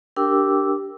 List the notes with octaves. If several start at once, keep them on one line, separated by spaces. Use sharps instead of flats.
D4 G4 A#4 G5 D6 E6